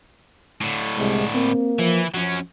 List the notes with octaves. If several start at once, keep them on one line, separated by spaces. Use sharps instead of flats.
A2 D3
C2 G#3
A#3 C4
E3 F3
F3 F#3 C#4